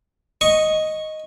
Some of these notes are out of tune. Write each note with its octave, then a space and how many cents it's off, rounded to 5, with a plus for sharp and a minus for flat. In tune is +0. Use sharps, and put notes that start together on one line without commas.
D#5 +0 C#6 -10